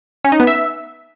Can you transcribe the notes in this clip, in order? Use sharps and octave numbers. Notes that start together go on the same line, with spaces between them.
C#4
D#4
B3
E5